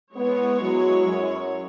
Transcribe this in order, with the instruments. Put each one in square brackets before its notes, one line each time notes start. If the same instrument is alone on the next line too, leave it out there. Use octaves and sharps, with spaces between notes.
[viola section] G#3 E4 C#5 [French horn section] B3
[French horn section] F#3
F#2